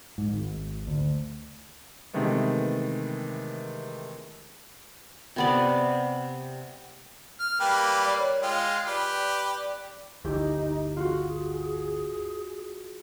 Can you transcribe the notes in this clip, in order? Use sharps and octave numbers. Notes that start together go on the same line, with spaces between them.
G#2
G#1
D2
C3 D#3 E3 G#3 A3 B3
C3 B3 D5
F6
G3 A#3 B4 G5
D5
C#5
G#3 F4 G5
G4 B4 D5
G1 D2 D#4 E4 G4
F4 F#4 G#4